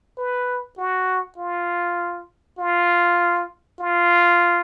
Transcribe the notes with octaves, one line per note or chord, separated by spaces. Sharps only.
B4
F#4
F4
F4
F4